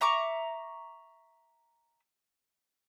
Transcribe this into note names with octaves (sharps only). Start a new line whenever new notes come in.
E5 A#5 C#6 D6